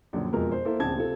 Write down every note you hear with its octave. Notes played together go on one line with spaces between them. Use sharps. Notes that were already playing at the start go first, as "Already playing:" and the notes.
A#1 F#2 D3
E1 F2 B2 F3 G#3 A#4
C5
A#3 E4 A4 C5
D1 A#1 C#3 C4 A5 G#6
C3 C4 F4 A4